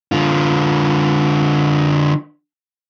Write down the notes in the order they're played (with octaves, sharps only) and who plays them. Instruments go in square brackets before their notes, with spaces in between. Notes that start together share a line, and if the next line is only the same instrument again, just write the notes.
[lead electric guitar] D3 F4